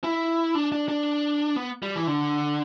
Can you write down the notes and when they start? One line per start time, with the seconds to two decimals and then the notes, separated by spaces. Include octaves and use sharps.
0.04 E4
0.55 D4
0.72 D4
0.88 D4
1.56 B3
1.83 G3
1.95 E3
2.07 D3